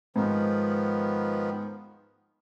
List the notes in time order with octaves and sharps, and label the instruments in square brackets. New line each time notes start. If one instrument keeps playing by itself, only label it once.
[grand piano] G#2 [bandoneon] D#3 F3 B3